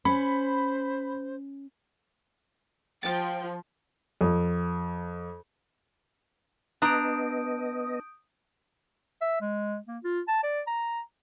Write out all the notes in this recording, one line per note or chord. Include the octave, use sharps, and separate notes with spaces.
C#4 C5 B5
F3 G5 A6
F2
B3 D4 D#5 A#5 D#6 G6 D7
E5
G#3
A#3
F4
A5
D5
A#5